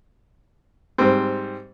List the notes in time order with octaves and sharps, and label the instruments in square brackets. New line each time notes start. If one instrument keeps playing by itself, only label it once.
[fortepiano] G#2 G3 C4